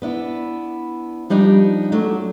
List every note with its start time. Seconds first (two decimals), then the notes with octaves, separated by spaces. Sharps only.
0.02 B3 D4 E4
1.30 F3 G3 D4 D#4
1.92 F#3 A3 D4